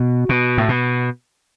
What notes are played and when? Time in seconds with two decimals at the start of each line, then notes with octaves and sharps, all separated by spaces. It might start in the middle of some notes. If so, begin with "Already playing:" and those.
Already playing: B2
0.29 B2
0.58 A2
0.69 B2